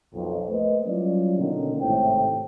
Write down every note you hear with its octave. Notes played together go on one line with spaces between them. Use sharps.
B1 F2
A3 A#3 B4 C5 D#5
F#3 G3 C#4 E4 F4 D5
B2 D3 D#3 A#3 C#4
G#1 A2 C3 C5 G5